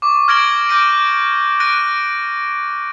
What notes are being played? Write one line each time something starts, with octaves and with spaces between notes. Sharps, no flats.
C#6 D6
F6 G#6 A#6 D7 F#7 G7
D6 G6 A#6 D7 D#7
F#6 A#6 D7 D#7